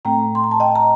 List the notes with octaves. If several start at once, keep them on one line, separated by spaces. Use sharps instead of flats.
A2 A3 C4 G5 A#5
C6
A#5
A5
D#5 G5
A#5